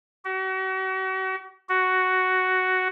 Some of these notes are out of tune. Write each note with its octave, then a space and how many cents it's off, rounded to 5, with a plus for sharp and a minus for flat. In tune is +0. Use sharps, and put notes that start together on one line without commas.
F#4 +40
F#4 +5